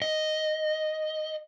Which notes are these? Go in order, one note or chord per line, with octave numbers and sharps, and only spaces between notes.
D#5